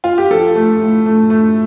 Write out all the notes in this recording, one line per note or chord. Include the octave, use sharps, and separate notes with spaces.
F4
G4
F3 A4
A3
A2
A3
A3